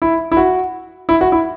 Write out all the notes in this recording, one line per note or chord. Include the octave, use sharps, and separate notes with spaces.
E4
E4
F#4
E4
F#4
E4